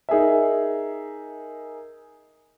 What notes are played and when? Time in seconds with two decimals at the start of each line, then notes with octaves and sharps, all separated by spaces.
0.09 D#4 G#4 A#4 E5